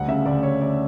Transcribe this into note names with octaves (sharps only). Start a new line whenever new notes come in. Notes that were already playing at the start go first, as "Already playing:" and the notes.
Already playing: D2 G3 F#5
C#3 E5
D2 D5
D2 C#5
D2 D5